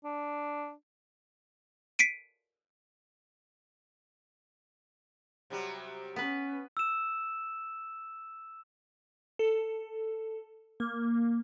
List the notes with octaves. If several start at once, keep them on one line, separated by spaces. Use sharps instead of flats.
D4
B6 C7 D7 D#7
C3 F#3 G3
B3 C#4 B4
E6 E7
A4
A#3